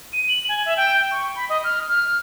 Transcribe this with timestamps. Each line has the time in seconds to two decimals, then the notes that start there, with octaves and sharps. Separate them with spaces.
0.13 D#7
0.29 F#7
0.49 G#5
0.66 E5
0.77 G5
1.11 C#6
1.36 B5
1.49 D#5
1.64 F6
1.88 F6